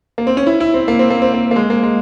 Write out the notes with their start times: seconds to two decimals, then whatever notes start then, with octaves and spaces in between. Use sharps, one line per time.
0.18 A#3
0.27 C4
0.37 C#4
0.47 E4
0.60 E4
0.74 C4
0.88 A#3
0.99 C4
1.10 A#3
1.22 C4
1.34 A#3
1.51 A#3
1.56 G#3
1.70 A#3
1.83 G#3